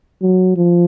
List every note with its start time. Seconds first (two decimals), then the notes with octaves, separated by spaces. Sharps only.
0.22 F#3
0.56 F3